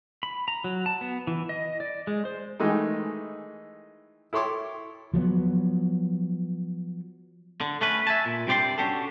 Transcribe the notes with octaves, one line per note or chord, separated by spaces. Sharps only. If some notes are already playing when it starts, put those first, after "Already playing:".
B5
A#5
F#3
A5
B3
E3
D#5
D5
G#3
C5
D#3 E3 G#3 A3 D#4
E4 A4 C#5 C6 D6
F3 F#3 A3 B3
D3
A3 C#4 B4
E5 G#5 A5
A#2
G2 C3 C5 D5 G5 C6
C#4 D4 F#4 G4 A4